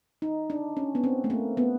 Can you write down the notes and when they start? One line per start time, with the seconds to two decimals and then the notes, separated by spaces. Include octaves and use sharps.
0.22 D#4
0.50 D4
0.77 C#4
0.95 B3
1.04 C4
1.24 A3
1.30 A#3
1.57 B3